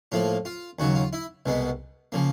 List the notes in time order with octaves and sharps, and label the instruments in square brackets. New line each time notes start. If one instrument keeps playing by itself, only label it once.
[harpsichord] A2 F3 A#3 F4
F4
D#2 C#3 F#3 F#4
F4
E4
C2 B2 G#3 B3
C#3 F3 A#3